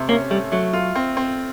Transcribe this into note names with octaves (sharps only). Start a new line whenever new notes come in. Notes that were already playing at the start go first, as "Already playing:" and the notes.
Already playing: C3 A3
A#3 C#4
G3 A3
F#3 A3
F4
C4
C4